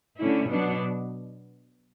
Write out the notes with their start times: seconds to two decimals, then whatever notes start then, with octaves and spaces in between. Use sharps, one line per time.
0.18 D3 A3 C#4 E4
0.50 B2 F#3 B3 D4